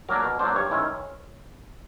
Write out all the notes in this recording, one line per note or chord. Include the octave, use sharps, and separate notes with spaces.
F#3 A#3 D4 A#4
B2
F#3 A#3 D4 C5
G2 C#5
D#3 G#3 C#4 E4